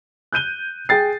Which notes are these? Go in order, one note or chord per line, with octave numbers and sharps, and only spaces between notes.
F#6 G6 D#7 G7
G#4 G5 A6 C7